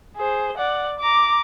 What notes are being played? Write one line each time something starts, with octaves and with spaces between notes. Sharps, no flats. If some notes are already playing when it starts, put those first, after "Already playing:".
G#4 C5
D5 F#5
A#5 D6